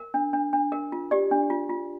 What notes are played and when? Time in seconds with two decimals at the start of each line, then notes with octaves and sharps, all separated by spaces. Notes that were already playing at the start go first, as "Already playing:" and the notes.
Already playing: A#4
0.14 D4
0.33 D4
0.53 D4
0.72 A#4
0.92 F4
1.11 G4 D5
1.31 D4
1.50 F4
1.70 F4